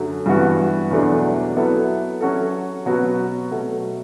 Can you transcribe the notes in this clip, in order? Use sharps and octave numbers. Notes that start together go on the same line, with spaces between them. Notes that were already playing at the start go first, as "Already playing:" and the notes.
Already playing: F#2 D3 F#3 A3
G2 E3 B3 F#4
E2 B2 F#3 A3 D4
F#3 B3 E4 A4
F#3 C#4 F#4 A4
B2 F#3 B3 F#4
B2 F#3 A3